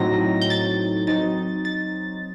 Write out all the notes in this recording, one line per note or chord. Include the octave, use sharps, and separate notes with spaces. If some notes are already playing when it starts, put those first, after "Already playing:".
Already playing: A2 F#3 C4 D#4 A#6
G6
A6
F#3 C4 D#4 A6
A6